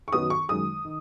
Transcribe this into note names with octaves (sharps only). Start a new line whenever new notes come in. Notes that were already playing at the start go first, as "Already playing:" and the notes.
C#6
F#2 D#3 F#3 B3 D#6
C#6
F#2 D#3 G#3 D#6
D#3